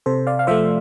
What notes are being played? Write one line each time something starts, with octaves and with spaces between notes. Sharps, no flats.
C3 A4 C5
D5 F5
F5
F3 A3 C5 E5